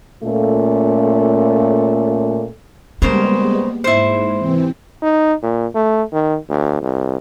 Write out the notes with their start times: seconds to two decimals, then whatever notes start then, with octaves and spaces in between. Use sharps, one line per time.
0.23 A#2 A3 C#4 F4 A4
3.02 C#3 G3 G#3 A#3 B3 A#4 C5
3.84 G#2 E4 C5
4.38 C3 E3 C4
5.02 D#4
5.43 A#2
5.75 A3
6.13 D#3
6.49 D2
6.81 C2